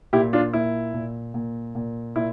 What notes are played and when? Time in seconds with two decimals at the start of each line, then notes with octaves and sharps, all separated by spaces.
0.13 A#2 E4 G4
0.33 D4 F4
0.53 A#2 E4
0.94 A#2
1.34 A#2
1.75 A#2
2.16 A#2 E4